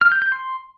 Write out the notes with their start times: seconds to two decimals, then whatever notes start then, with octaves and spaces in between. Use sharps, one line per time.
0.01 F6
0.12 G6
0.22 G6
0.32 C6